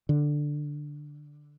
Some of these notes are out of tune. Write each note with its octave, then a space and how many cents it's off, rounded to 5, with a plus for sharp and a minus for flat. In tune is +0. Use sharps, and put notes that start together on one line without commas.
D3 +5